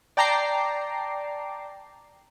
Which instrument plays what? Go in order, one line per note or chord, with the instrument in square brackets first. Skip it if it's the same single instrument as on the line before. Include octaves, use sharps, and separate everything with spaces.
[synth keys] D5 G5 A5 A#5 D6 C7